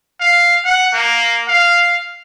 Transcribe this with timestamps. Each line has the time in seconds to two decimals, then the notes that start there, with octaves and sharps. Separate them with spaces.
0.20 F5
0.65 F#5
0.94 A#3
1.48 F5